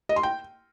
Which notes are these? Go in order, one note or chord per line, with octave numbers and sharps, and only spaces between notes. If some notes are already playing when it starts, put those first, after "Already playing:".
D#5
C6
G5